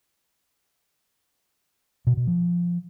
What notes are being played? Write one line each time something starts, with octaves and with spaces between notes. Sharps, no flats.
B2
B2
F3